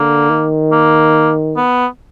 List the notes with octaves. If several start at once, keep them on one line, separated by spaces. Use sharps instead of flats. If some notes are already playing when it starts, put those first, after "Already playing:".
Already playing: D3 A#3
D#3
A#3
B3